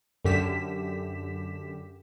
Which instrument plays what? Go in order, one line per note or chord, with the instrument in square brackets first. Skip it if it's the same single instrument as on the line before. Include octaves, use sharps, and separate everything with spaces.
[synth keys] F#2 D3 G4 B6 E7